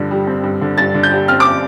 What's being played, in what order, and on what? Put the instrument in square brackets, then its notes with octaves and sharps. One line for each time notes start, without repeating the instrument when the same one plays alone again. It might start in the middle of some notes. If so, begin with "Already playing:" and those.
Already playing: [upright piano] G2 D3 F3
G3
C4
G2
D3
G2 A6
D3
G6
G3
C4 F6
D6